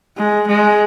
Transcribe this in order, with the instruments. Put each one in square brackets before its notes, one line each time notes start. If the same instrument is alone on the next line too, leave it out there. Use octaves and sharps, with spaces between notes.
[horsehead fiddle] G#3
G#3